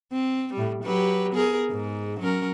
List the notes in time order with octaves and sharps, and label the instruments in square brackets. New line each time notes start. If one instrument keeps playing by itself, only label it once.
[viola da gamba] C4
A2 G3
F#3 G4 B4
B3 G#4 A#4
G#2
F#3 C#4 A#4